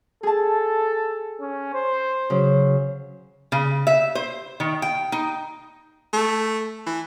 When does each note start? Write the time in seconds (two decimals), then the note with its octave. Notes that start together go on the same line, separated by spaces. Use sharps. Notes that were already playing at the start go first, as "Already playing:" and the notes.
0.23 G#4 A4 A5
1.40 C#4
1.74 C5
2.30 C#3 F#3
3.52 C#3
3.87 E5
4.15 C5
4.60 D#3
4.82 G5
5.12 D#4
6.13 A3
6.87 E3